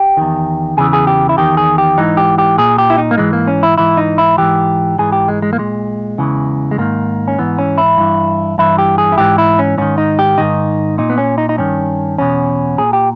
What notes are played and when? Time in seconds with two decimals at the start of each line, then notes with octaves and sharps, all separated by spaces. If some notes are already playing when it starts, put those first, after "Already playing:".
Already playing: G4
0.17 E2 D#3
0.77 E2 C#3 E3 G#4
0.93 G#4
1.07 G4
1.29 E4
1.37 E2 D#3 G4
1.57 G#4
1.78 G4
1.98 G#2 E3 D#4
2.17 G4
2.38 G4
2.58 A#2 G#4
2.78 G4
2.90 E4
2.98 D#4
3.11 A#3
3.18 G#2 E3 G#3
3.33 A#3
3.47 C#4
3.63 E4
3.78 G#2 E3 E4
3.97 D#4
4.18 E4
4.38 G#2 E3 G4
4.98 G#2 E3 G#4
5.12 G4
5.28 G#3
5.42 G#3
5.53 A#3
5.58 A#2 G#3
6.18 E2 C#3 E3
6.71 G#3
6.78 G#2 D#3 A#3
7.28 C#4
7.39 G#2 E3 B3
7.58 C#4
7.78 E4
7.98 G2 E3
8.58 G2 E3 E4
8.78 G4
8.98 G#4
9.12 E4
9.18 G#2 E3 G4
9.38 E4
9.59 C#4
9.78 G#2 D#3 C#4
9.98 D#4
10.19 G4
10.38 G#2 D#3 D#4
10.98 A#2 D#4
11.10 B3
11.18 C#4
11.38 D#4
11.49 D#4
11.58 G2 D#3 C#4
12.18 E2 B2 C#4
12.78 A#2 G#4
12.93 G4